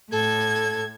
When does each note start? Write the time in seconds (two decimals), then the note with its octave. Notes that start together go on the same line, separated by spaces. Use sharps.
0.12 A2 A4 G#6